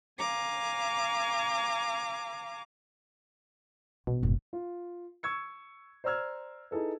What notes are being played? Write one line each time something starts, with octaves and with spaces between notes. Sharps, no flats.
F5 G#5 A#5 D6
A#1 B2
F#1 G#2
F4
C#6 E6 G#6 C#7
C5 D5 A#5 E6 F6 G#6
D#4 E4 G#4 A4 B4